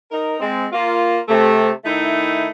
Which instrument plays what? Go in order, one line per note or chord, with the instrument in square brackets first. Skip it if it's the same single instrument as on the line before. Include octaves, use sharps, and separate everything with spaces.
[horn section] D#4 A#4
G#3 C4
A#3 F4
C3 A3
D#3 A3 D#4 E4